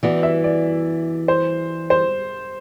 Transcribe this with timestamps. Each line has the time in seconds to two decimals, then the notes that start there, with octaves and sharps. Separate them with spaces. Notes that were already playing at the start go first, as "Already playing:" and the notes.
0.03 E3 B3 F#4 D5
0.23 E5
0.44 D5
1.28 C5
1.90 C5